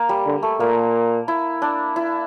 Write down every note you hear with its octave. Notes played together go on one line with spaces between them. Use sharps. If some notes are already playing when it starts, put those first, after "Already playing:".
Already playing: A#3
G3
D3
A3
A#2 A#3
E4
D4
E4